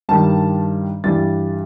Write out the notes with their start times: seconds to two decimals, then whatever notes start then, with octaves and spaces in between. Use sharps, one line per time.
0.09 G2 D#3 G3 A5
1.04 G2 E3 G3 A6